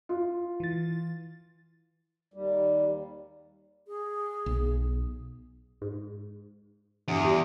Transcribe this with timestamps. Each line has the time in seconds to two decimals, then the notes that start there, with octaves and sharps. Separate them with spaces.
0.09 F4
0.60 E3 A6
2.34 D#2 G3
3.87 G#4
4.46 B1
5.82 G#2
7.08 E2 G2
7.25 G3